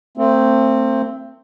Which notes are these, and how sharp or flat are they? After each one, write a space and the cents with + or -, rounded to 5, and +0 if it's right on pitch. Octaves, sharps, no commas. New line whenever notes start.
A3 +40 C4 +5